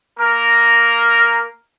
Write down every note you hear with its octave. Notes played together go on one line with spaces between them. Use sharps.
A#3 A#4